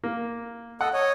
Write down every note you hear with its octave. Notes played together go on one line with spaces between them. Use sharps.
A#3
A4 D#5 F#5
C#5 D#5